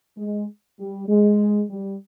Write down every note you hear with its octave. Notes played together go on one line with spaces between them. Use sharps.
G#3
G3
G#3
G3